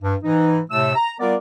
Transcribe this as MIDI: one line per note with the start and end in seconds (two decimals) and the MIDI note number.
0.03 0.16 43
0.24 0.60 44
0.24 0.60 52
0.24 0.60 63
0.71 0.93 45
0.71 0.93 48
0.71 0.93 57
0.71 0.93 88
0.95 1.14 82
1.20 1.36 55
1.20 1.36 59
1.20 1.36 65
1.20 1.36 70
1.20 1.36 74